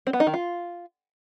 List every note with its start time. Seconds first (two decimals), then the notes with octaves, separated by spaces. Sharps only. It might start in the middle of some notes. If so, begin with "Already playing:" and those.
0.07 C4
0.13 B3
0.20 D#4
0.27 D#3
0.34 F4